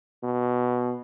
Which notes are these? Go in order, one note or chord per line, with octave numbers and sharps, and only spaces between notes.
B2